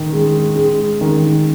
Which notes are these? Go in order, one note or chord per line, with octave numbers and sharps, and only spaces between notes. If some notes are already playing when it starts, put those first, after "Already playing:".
Already playing: D#3
G#3
G#3
D#3